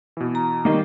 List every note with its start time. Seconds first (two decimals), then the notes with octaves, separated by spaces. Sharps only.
0.17 B2 E3
0.35 A#5
0.65 D#3 G3 A#3 D#4 D#5